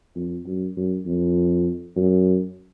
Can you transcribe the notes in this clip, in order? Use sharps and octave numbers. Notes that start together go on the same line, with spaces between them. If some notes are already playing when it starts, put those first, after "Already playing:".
F2
F#2
F#2
F2
F#2